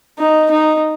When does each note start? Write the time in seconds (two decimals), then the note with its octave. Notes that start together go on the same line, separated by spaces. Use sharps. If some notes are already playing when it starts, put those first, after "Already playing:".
0.19 D#4
0.51 D#4